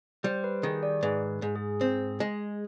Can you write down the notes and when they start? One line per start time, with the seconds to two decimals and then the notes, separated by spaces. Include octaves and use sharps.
0.24 G3 C5
0.44 B4
0.63 D#3 G#4
0.83 D5
1.03 G#2 B4
1.42 G#2
1.55 G#4
1.81 C4
2.20 G#3